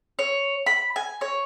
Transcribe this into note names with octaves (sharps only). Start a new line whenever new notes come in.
C#5
B5
G#5
C#5